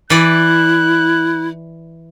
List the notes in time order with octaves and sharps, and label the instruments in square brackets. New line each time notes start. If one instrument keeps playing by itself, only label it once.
[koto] E3 D5 [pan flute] E4 [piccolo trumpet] F#6